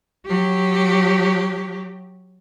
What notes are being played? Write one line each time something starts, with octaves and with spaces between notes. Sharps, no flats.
F#3 G4